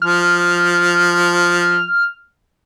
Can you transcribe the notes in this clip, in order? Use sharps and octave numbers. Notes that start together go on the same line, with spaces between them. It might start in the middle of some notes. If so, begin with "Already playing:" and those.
F3 F6